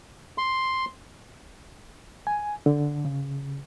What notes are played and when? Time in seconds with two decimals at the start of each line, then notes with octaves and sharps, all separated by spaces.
0.38 C6
2.27 G#5
2.66 D3
3.05 C#3